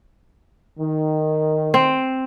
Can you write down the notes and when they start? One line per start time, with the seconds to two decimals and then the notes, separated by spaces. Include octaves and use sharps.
0.80 D#3
1.74 C4